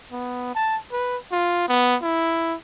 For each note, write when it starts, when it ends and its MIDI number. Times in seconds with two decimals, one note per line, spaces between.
0.12 0.51 59
0.55 0.78 81
0.92 1.17 71
1.32 1.68 65
1.69 1.96 59
2.02 2.55 64